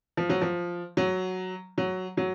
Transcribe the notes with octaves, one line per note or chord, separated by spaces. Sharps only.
F3
F#3
F3
F#3
F#3
F#3